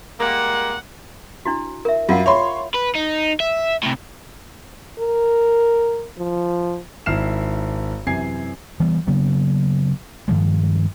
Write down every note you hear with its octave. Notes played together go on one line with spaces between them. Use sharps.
G3 G#3 A#3 F#5
D4 E4 F#4
A#4 E5
F#2 F4 F5 F#5
C#5 E5 B5 C6
B4
D#4
E5
A2 C3
A#4
F3
G#1 D#3 E4 F6 C7 E7
F#2 C3 E3 G#5 G#6 C7
E3 G3 B3
C#3 F#3 A#3 B3
G2 D#3 F3 G#3